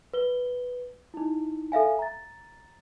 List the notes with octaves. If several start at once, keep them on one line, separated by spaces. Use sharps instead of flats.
B4 G7
D#4 E4
A4 E5 F5 G#5
A#5 A6